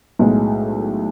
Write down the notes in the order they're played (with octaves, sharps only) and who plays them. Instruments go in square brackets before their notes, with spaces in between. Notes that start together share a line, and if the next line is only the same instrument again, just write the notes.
[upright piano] B1 A2 G#3